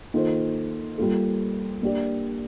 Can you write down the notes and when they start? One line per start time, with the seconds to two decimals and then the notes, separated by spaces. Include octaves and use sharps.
0.14 D#3 A#3 F4 A4 C5
0.98 G3 A#3 F4 A4
1.82 A#3 D4 G4 D5